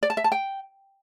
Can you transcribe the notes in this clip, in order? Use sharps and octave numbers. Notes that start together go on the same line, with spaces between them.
D5
A5
E5
A5
G5